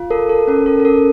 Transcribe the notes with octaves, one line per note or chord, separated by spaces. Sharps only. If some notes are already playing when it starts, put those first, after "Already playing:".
Already playing: F4
A4 A#4
A4
C#4 A#4
A4
A4
C#4 A#4